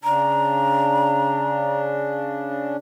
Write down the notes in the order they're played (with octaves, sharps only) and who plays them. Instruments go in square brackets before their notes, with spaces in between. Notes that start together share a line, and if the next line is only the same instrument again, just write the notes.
[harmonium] C#3 D4 [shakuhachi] A#5